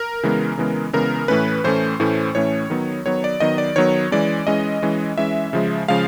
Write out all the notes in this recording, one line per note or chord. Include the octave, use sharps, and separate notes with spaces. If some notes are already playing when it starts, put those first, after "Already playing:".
Already playing: A#4
C#3 E3 G#3 B3
C#3 E3 G#3 B3
C#3 E3 G#3 B3 A#4
A2 E3 A3 C#4 B4
A2 E3 A3 C#4 C5
A2 E3 A3 C#4
A2 E3 A3 C#4 C#5
D#3 F#3 B3
D#3 F#3 B3 C#5
D5
D#3 F#3 B3 D#5
D5
D#3 F#3 B3 C#5
E3 G#3 C#4 D5
E3 G#3 C#4 D#5
E3 G#3 C#4
E3 G#3 C#4 E5
C#3 F3 G#3
C#3 F3 G#3 F5